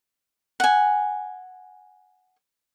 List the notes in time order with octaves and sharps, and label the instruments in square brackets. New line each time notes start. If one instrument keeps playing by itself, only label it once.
[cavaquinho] F#5 G#5